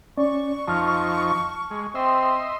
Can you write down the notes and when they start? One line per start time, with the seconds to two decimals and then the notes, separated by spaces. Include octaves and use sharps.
0.18 C#4 D5 C#6
0.67 F2 F3 D#4 A5 F6
1.71 G#3
1.95 C4 D#5 E5 C6